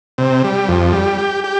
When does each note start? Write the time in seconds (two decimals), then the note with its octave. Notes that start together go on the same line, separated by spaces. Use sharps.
0.18 C3
0.44 G3
0.68 F2
0.93 G3
1.18 G4
1.44 G4